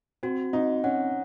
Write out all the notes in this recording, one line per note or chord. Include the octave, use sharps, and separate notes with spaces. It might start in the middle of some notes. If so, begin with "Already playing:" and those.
C4 F#4
C4 D#4
C#4 F#5